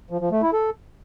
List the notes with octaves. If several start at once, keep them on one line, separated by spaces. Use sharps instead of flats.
F3
F3
A3
E4
A4